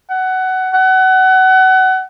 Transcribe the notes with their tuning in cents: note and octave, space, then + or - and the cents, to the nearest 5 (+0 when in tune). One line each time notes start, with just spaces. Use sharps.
F#5 +15
F#5 +25